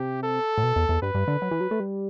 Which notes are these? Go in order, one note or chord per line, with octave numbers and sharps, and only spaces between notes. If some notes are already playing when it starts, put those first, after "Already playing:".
Already playing: C3 G4
A4
A2
B2
E2
E2
G2 B4
G2
D3
F#3
E3
F#3
A3
G3